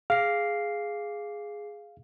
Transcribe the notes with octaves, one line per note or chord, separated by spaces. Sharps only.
G#4 F5 C7